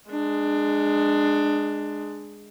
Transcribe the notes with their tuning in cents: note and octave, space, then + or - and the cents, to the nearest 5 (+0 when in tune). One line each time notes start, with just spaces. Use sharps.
G#3 +0 D4 +15